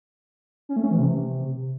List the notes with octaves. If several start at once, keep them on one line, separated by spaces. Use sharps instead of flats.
C#4
A3
C#4
E3
C3